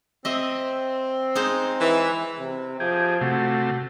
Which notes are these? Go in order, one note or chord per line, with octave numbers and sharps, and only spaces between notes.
C4 D#5 E5
G#3 D#4 C5
E3
C3
F3 G4 G#4
C3 A3 F#4